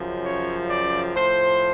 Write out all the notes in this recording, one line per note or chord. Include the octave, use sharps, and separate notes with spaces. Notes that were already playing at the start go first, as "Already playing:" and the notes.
Already playing: F#2 C#3 F3
C#5
D5
A2 F3 C5